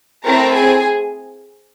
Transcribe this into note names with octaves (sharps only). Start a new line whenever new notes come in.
A3 C4 E4 A#4 A#5
G#4 G#5